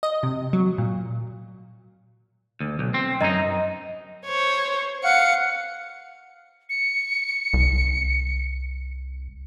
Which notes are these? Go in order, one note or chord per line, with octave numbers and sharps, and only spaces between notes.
D#5
C3
F#3
A#2
D2
B1
C4
F#2 D#4 D#5 A#5
C5 C#5
F5 F#5 C#7
C#7
C2